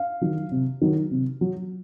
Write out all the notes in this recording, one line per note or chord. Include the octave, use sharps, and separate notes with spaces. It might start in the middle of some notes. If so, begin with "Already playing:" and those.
Already playing: F5
D#3 F#3
C3
D#3 F#3
C3
F#3